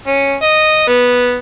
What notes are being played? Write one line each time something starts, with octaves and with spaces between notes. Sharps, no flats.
C#4
D#5
B3